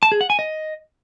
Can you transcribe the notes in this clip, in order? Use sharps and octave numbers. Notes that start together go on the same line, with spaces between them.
A5
G#4
F#5
G#5
D#5